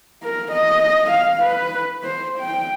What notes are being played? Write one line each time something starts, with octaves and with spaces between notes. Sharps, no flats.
A#4
D#5
F5
B4
C5
G5